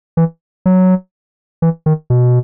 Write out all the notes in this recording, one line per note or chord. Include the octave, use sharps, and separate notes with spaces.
E3
F#3
E3
D#3
B2